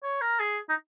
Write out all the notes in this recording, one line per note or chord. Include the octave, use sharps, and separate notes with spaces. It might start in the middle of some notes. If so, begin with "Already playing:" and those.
C#5
A#4
G#4
D#4